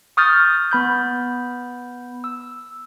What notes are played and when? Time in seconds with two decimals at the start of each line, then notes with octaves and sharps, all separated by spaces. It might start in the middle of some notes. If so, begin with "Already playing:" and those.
0.17 C#6 D#6 F6 G6 A6
0.71 B3 B5 G6
2.24 E6